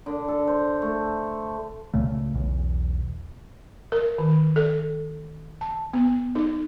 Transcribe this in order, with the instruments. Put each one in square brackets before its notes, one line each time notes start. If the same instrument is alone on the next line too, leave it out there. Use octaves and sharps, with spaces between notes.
[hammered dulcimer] D3
A4
C5
A3
[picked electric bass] C#2 A#2 C#3 A3
B1 E2
[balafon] A#4
D#3
A4
A5
B3
D#4